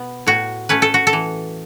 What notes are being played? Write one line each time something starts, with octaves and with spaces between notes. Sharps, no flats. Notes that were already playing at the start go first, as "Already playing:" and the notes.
Already playing: B2 B3
A2 F#4
A3 C#4 B4
A4
F#4
A4
E3